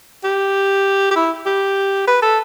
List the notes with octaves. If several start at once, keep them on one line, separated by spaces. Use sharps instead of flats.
G4
G4
E4
G4
B4
A4